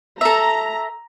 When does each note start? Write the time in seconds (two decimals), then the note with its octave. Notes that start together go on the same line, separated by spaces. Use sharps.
0.21 A4 E5 A#5